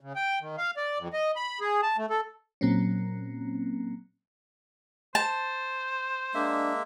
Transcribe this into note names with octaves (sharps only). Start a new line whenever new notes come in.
C#3
G5
D#3
F5
D5
F2
D#5
B5
G#4
A5
A3
A4
A#2 F#3 A#3 C4 C#4
C5 A5
G#3 A#3 D4 E5